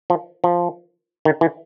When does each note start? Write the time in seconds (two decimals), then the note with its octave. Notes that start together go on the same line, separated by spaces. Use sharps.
0.10 F3
0.44 F3
1.25 D#3
1.41 E3